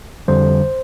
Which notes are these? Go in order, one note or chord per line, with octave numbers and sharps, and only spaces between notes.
F2 D3 G3 C5